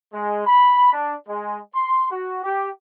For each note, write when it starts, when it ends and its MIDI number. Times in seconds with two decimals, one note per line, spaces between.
0.13 0.46 56
0.47 0.92 83
0.93 1.14 62
1.28 1.58 56
1.75 2.10 84
2.11 2.41 66
2.44 2.69 67